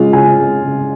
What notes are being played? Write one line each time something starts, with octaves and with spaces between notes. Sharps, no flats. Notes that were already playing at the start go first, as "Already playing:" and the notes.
Already playing: C#3 G#3 F4
C#3 G#5
G#3
C#3